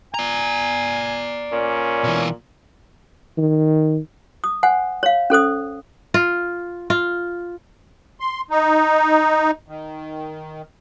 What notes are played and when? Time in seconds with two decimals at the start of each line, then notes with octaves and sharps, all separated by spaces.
0.14 D5 G#5 A#5
1.52 A#2 C#4
2.04 B2 E3
3.37 D#3
4.44 D#6
4.63 C5 F#5 G#5
5.03 C#5 F5
5.30 C#4 A4 C5 D#6
6.14 F4
6.90 F4
8.20 C6
8.50 D#4
9.68 D#3